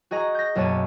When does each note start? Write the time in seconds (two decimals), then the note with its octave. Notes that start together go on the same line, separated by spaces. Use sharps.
0.11 F#4 G#4 D#5 A#5
0.35 G6 A#6
0.55 B1 F#2 A#3 C#5 A5 D#7